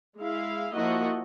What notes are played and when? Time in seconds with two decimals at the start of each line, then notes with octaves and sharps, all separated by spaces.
0.18 G#3 E4 F5
0.73 F3 A#3 E4 F#4 D#5